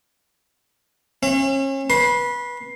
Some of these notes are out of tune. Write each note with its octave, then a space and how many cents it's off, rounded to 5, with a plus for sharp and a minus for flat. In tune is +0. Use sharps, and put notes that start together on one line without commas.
C#4 -35 E5 +45
B4 -20 C6 +15